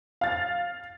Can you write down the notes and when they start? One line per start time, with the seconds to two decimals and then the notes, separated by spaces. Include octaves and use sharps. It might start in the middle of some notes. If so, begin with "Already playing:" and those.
0.21 F5 A6